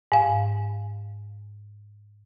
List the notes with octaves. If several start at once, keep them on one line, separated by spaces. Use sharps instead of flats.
G#2 F5